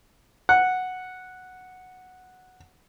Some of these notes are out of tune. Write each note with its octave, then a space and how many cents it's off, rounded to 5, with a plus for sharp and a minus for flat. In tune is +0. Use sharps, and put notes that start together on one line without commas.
F#5 -5